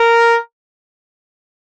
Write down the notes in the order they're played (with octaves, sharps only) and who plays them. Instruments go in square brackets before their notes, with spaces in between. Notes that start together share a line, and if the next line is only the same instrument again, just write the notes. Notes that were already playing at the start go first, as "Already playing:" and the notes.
Already playing: [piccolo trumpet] A#4